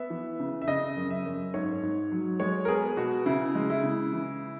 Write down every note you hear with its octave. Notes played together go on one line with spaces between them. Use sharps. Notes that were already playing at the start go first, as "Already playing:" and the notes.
Already playing: B3 E5
E3
C#3
E5
C#3 D#5
F#2
E5
F#2
G#2 C#5
G#2
F#3
G#3 C#5
A#4
B3 G#4
B2 F#4
C#3 E4
G#3
E4
C#3
E3